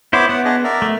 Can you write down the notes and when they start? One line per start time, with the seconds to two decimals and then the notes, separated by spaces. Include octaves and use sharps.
0.13 B3 E4 C5 C#5 D6
0.29 B3 F#5
0.45 D4 G#4 D#5
0.64 A#4 D5 E5
0.82 A3